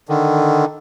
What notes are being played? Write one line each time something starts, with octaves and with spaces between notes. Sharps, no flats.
D3 D#3